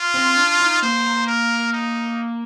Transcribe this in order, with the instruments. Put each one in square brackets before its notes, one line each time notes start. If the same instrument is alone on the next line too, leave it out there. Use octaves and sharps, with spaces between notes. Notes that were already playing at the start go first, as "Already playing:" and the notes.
Already playing: [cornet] F4
[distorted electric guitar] C4
D4
D#4
[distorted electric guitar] A#3 [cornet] C5
[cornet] A#4
D#4